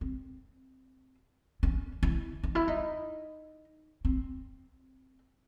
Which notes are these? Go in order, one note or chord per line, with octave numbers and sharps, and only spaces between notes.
C4
C#4
E4
D#4
E4
D#4
C4